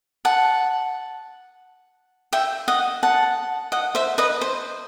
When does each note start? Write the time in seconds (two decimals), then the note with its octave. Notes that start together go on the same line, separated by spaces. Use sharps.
0.25 F#5 A5
2.33 E5 G5
2.68 D#5 F#5
3.03 F#5 A5
3.72 D#5 F#5
3.95 C5 E5
4.18 B4 D#5
4.41 C5